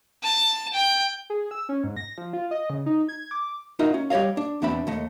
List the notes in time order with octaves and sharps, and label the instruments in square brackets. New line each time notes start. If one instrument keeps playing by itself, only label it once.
[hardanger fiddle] A5
G5
[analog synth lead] G#4
E6
C#4
G#2
A#6
F3
F4
D#5
C#3
D#4
G#6
D6
[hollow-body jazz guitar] D#4 F4 F#4 A#4 D#5 E5
C#4
G3 G4 C#5 D#5 F5
D4
E2 B2 C4 D4 E5 B5
D#2 A3 D#5